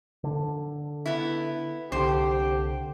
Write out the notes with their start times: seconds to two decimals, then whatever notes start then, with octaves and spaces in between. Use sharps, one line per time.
0.24 D3
1.06 B3 E4
1.92 C2 D3 G4 C5